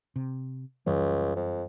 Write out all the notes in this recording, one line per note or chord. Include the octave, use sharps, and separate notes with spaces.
C3
C#2 F#2 E3 G3
F2